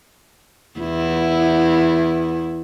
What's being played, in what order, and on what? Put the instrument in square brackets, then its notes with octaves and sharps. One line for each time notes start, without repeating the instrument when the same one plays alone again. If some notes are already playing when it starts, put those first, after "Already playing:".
[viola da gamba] E2 E4